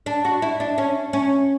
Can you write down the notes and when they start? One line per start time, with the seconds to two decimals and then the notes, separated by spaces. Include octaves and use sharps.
0.06 D4
0.25 F#4
0.42 E4
0.60 D4
0.78 C#4
1.13 C#4